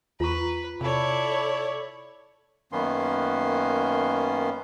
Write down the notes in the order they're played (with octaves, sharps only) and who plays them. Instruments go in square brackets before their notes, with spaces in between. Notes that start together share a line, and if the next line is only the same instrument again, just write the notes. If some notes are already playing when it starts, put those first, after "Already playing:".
[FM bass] E2 [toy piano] F4 A#5 C#6 [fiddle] B4
[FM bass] C3 [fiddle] E4 D5 [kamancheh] A4 C#5 [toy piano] B5
[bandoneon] F#2 D#3 A#3 B3 C#4 C6